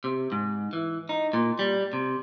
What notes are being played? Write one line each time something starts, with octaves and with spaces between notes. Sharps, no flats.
C3
G#2
E3
D#4
A#2
G3
C3